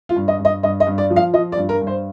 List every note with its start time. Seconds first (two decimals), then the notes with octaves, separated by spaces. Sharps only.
0.09 F4
0.16 G2
0.28 D#5
0.39 G2
0.45 D#5
0.63 G2 D#5
0.80 D#5
0.87 G2
0.98 D5
1.10 F3
1.16 F5
1.33 F3 D#5
1.52 D5
1.57 G2
1.69 A#4
1.81 G2
1.87 C5